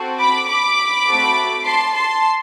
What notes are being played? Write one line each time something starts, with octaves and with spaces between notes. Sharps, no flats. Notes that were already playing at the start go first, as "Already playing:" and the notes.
Already playing: C4 F#4 A4
B5 D6
B5 D6
A3 C4 F#4 A4
A5 C6
A5 C6